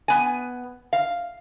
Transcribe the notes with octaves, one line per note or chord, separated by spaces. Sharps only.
B3 G#5
F5